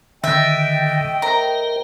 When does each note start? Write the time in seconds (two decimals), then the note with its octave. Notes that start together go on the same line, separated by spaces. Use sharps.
0.24 D3 D#3 A3 D#5 E5 G5
1.22 A#4 C5 A#5